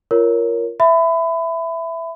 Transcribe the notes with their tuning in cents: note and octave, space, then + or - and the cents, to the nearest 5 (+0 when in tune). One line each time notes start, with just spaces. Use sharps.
F4 -20 A#4 +0 C#5 +5
E5 +5 B5 +30